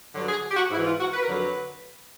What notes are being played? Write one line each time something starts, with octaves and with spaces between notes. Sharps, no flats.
G2 D3 F#3
G#4
G4
F#4
G#2 E3 E4
F4
F#4
B4
A#4
F2 D3 F#3 B4